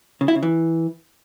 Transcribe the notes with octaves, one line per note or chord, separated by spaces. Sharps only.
C#3
E4
C#3
E3